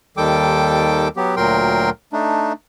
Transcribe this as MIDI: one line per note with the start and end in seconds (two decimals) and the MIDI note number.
0.17 1.08 39
0.17 1.08 51
0.17 1.08 55
0.17 1.08 69
0.17 1.08 79
0.17 1.08 86
1.17 1.35 54
1.17 1.35 59
1.17 1.35 67
1.37 1.90 38
1.37 1.90 46
1.37 1.90 54
1.37 1.90 70
1.37 1.90 79
1.37 1.90 84
2.13 2.53 57
2.13 2.53 62
2.13 2.53 63